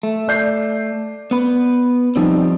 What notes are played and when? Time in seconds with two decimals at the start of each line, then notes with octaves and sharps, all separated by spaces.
0.03 A3
0.28 D5 G6 C7
1.31 B3 B4
2.16 F3 G3 C4 D#4